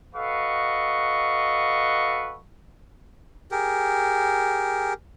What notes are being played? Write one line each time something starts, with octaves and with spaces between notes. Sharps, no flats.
F#4 A4 B4 D#5 F5 C#6
G4 G#4 A#4